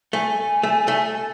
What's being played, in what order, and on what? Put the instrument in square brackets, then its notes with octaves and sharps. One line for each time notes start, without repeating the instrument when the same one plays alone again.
[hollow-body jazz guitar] A3 [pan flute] G#5
[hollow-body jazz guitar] A3
A3